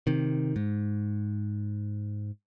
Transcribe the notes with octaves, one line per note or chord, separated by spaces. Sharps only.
C3 D#3
G#2